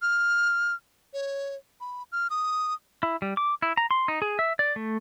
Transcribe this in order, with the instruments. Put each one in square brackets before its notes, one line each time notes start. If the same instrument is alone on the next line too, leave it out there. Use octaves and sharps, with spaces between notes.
[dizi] F6
C#5
B5
F6
D#6
[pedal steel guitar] E4
G3
D6
E4
A#5
C6
D#4
G#4
E5
D5
A3